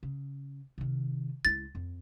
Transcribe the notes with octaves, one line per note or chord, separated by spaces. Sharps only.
C#3
C3 D#3
C#2 E4 A6
F2